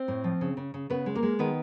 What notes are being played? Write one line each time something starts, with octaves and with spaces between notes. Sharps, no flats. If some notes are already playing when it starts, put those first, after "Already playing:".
Already playing: C4 C5
A2
F3
C#3
C#3
C#3
C#3 B3 B4
G#3
A#3 A#4
G#3
D#3 B3 B4